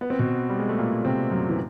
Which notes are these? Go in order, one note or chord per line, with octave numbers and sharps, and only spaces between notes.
B3
C4
B2 B3
G3
G#3
A3
A#2 A#3
C3 C4
F#2 F#3
E3